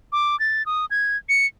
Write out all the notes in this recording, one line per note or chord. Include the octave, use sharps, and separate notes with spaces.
D6
A6
D#6
G#6
C#7